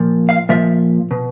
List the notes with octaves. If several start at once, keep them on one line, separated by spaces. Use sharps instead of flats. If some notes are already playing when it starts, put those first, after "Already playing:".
Already playing: A#2 F3
F5
A#2 F3 E5
B2